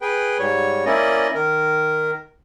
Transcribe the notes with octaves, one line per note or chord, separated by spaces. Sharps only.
G#4 B4 G5
G#2 G3 C#5
A#3 C#4 E4 D5 D#5
D#3 A#4